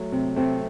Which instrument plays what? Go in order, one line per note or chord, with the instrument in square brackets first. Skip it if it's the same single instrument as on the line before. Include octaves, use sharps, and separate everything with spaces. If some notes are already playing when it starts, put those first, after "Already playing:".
Already playing: [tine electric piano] F#3 A3
[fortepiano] C3
[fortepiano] C3 [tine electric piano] A3 C4